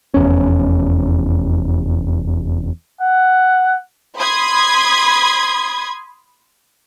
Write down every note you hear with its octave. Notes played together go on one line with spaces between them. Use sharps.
F1 E2 C#4
F#5
B5 C6 D#6 G#6